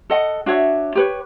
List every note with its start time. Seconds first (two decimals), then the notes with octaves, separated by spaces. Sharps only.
0.10 A4 D#5 F#5
0.46 D4 F#4 C#5 E5
0.95 G4 B4 C#5